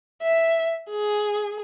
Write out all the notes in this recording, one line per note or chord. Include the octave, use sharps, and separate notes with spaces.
E5
G#4